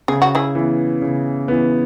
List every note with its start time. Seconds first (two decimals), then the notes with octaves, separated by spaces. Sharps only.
0.08 C#3 G#4
0.22 F#4
0.35 E4 G#4
0.55 E3 B3
1.02 C#3
1.48 E3 B3